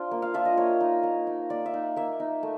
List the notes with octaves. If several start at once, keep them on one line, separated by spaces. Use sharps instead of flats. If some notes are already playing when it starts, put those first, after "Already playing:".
Already playing: D4 F4 C5
A#3
F5
D4 F4 E5
D#5
A#3 C#5
D#4
A#3
D#4
A#3 D5
E5
D#4
A#3 E5
D#4
A3